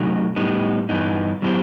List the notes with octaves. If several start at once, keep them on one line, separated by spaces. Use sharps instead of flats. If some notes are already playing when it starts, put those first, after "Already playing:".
Already playing: C3 F#3 A3 D#4 F#4
A2 G3 B3 D#4
G2 E3 B3 D#4
F#3 B3 E4 G4 C5